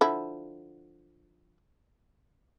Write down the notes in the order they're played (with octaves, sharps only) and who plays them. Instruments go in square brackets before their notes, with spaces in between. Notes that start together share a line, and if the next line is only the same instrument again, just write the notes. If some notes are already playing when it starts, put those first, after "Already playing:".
[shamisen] D3 F3 E4